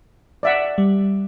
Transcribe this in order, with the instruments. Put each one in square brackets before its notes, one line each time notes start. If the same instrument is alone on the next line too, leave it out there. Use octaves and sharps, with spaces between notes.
[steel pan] D5 E5 F#5
[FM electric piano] G3